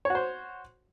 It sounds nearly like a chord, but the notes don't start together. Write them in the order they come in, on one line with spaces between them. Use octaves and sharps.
C#5 F#4 C5